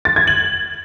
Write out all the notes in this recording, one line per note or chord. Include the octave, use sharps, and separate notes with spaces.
A6
G#6
F#7